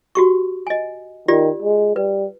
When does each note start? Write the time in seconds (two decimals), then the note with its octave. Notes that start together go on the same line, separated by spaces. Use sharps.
0.15 F#4 G4 C#6
0.67 D#5 G#5
1.28 D#3 F4 G4 D5
1.62 G#3
1.96 G3 B4